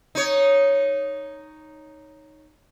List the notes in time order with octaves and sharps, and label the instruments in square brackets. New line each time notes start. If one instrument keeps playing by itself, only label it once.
[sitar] D#4 C#5